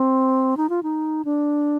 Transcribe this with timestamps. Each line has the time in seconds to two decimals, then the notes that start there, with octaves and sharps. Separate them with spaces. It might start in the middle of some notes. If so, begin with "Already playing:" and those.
Already playing: C4
0.57 D#4
0.70 F4
0.83 D#4
1.25 D4